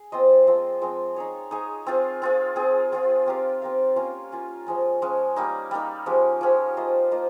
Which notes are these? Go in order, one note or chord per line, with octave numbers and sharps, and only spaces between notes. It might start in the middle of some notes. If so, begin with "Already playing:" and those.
Already playing: G#4
C4 F4 C5 D#5
F3 G#3 C4
F3 G#3 C4
D#4 G#4 C#5
D#4 G#4 C#5
C4 F4 G#4
C4 F4 G#4
C4 F4 G#4
C4 F4 G#4
C4 G4 A#4 F5
C4 G4 A#4 F5
A#3 C#4 F4
A#3 C#4 F4
F3 G#3 C#4
F3 G#3 C#4
G3 A#3 D#4
G3 A#3 D#4
F3 G#3 C#4 G4
F3 G#3 C#4 G4
A#3 F4 C5 D#5
A#3 F4 C5 D#5